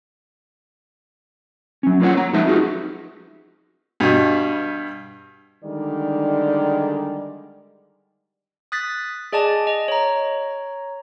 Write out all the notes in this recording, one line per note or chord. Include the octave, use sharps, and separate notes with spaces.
F#3 C#4
A#3 F4 B4 C#5 F#5
C#5 A#5
F3 G#3 D#4 B4 E5 A5
D#4 F4 F#4 G#4 B4
G2 B2
D3 D#3 G3 G#3 D#4 D5
D#6 F#6 A6 B6
G#4 D5 D#5 G#5 A5
D#5
C#5 A#5